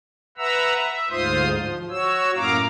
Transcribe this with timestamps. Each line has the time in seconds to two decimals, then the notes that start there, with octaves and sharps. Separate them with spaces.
0.38 B4 E5 F#5 A#5 E6
0.81 E5
1.10 D2 G#2 F4 C5 C6 D#6
1.50 F3
1.90 F#4 C#5 E6
2.35 F#2 A2 A#3 F5 A#5 D6